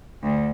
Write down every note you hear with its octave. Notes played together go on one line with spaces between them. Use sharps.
D2